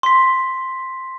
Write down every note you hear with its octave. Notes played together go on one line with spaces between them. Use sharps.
C6 B6